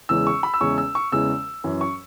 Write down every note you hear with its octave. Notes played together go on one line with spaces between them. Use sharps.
E2 C#3 E3 G#3 C#4 E6
C#6
B5
E6
E2 C#3 E3 G#3 C#4 C#6
E6
C#6
E2 C#3 E3 G#3 C#4 E6
F#2 E3 C#4
C#6